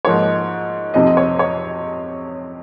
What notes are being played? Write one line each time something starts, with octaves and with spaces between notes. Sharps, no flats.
G#2 F3 A#3 D#4 C#5
F2 C3 F3 C4 D#4 D#5
D#5
C#5
C#5